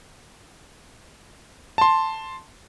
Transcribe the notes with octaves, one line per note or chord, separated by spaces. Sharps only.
A5 C6